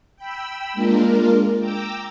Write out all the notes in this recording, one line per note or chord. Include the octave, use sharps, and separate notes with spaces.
G5 B5 E6
G#3 A#3 D4 F4 A#4
G5 A#5 D6 E6